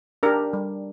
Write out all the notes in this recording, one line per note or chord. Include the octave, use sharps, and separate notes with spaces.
D4 G4 A#4
G3